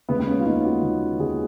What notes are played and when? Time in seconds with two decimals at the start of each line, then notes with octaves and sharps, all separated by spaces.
0.09 D#2 C#3 G#3 B3
0.20 B3
0.27 C#4
0.40 F4
0.46 D#2 C#3 G#3 D#4
0.65 F#4
0.83 D#2 C#3 G#3
1.19 D#2 C#3 G#3 G#4